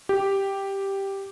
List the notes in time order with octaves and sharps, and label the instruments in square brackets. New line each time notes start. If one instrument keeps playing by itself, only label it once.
[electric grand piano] G4